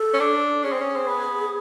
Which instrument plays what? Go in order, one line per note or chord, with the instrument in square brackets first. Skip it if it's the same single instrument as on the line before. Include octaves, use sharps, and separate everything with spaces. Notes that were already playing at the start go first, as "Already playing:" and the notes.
Already playing: [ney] A4
[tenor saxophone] C#4
D4
[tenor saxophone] C#4 [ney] G#4
[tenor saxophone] C4
C#4
C4
B3